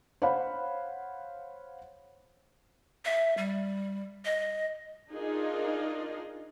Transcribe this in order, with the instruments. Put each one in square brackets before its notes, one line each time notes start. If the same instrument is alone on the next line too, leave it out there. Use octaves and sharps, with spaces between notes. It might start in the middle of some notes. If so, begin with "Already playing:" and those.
[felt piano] C5 C#5 F5 F#5 B5
[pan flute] E5
G3
D#5
[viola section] D4 D#4 F4 G#4 A#4 D#5